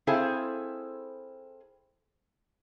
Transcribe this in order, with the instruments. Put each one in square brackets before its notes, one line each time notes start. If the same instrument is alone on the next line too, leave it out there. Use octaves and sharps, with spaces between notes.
[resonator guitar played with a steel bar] C4 E4 G#4 A4 C5 F5